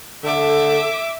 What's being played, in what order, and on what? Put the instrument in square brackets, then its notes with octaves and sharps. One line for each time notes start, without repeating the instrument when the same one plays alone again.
[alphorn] D3 [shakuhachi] A4 [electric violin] E5 D6